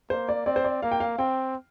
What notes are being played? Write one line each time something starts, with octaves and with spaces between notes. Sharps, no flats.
A#3 C5
D5
C4 D5
C5
D5
A#3 F5
G5
F5
C4 G5